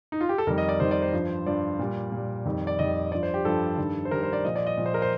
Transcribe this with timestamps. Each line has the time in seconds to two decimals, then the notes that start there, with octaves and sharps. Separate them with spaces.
0.12 D#4
0.21 F4
0.29 G4
0.38 A4
0.47 F2 D#3 G3 A#4
0.58 D#5
0.69 D5
0.80 F2 D#3 G3 C5
0.91 D5
1.02 C5
1.13 G2 F3
1.46 G2 F3 D5
1.79 A#2 G3
2.12 A#2
2.17 G3
2.45 F2 D#3 G3
2.67 D5
2.79 F2 D#3 G3 D#5
3.12 G2 F3 D5
3.23 C5
3.34 G4
3.45 G2 F3 A4
3.78 G2 D#3 G3
4.05 C5
4.11 G2 D#3 G3 A#4
4.23 C5
4.33 D5
4.44 A#2 F3 D#5
4.56 D5
4.67 D#5
4.77 A#2 F3
4.86 C5
4.94 A#4
5.02 C5